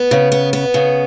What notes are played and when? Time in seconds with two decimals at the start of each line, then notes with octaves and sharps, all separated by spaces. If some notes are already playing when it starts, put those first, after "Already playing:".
Already playing: B3
0.11 C#3
0.32 B3
0.53 B3
0.74 C#3